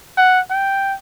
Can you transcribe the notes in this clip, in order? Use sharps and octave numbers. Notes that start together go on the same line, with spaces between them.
F#5
G5